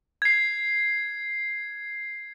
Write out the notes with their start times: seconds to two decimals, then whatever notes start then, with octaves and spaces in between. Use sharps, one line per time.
0.22 G#6 C7